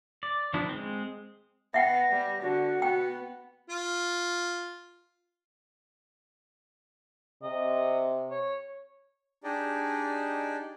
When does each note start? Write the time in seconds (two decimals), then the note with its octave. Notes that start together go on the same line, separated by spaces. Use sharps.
0.23 D5
0.54 D#3 F3 B3 D4 E4
0.69 G#3 C4
1.74 B3 E5 F#5 G5 A#6
2.12 G3
2.41 D3 F#4
2.82 B3 F#4 G5
3.70 F4
7.43 C3 D#5
8.31 C#5
9.44 D4 D#4 G4 G#4 D5 D#5